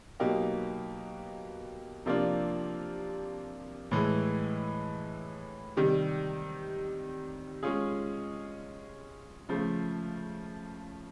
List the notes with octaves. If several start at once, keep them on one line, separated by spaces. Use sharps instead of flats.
B2 F#3 A#3 D#4 G4
C3 F3 A#3 D4 F4
A2 E3 G#3
C3 D#3 G3
G#3 C#4 F4 G#4
C#3 F3 A3